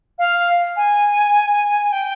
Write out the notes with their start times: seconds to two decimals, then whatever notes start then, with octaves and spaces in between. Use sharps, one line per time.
0.18 F5
0.76 G#5
1.92 G5